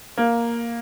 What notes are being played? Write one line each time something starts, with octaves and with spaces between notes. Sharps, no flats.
A#3